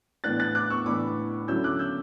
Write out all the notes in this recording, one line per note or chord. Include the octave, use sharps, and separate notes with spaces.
A2 E3 B3 D4 F#6 A6
F#6 A6
D6 F#6
C#6 E6
A2 E3 B3 D4 B5 D6
D3 F#3 C#4 E4 E6 G6
D6 F#6
E6 G6